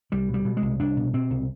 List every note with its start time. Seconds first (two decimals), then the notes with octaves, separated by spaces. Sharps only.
0.12 C2 G3
0.29 B2
0.34 G3
0.45 B2
0.57 G#3
0.62 C2
0.80 C2 D4
0.97 B2
1.13 B2 C4
1.30 C2